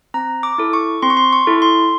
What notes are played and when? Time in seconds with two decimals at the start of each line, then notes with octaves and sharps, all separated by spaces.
0.14 C4 A#5
0.43 D6
0.58 E4 A4
0.73 C#6
1.02 C4 C6
1.10 C#6
1.17 C6
1.33 C#6
1.47 E4 A4
1.62 C6